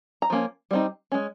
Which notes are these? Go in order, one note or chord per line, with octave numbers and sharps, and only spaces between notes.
A#5
F3 A#3 C#4
G3 C4 D#4
G#3 C#4